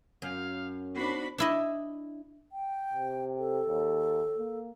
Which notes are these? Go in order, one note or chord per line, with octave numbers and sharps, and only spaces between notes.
F#2 F5
B3 D4 D#4 F#4 C5 B5 C7
D4 E4 D#5
G5
C3
A4
D#2
A#3